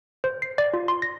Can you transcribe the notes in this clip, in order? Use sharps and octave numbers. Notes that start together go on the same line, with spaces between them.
C5
C7
D5
F4
C6
A#6